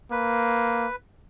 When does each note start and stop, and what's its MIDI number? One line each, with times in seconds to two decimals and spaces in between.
0.11 0.87 58
0.11 0.96 71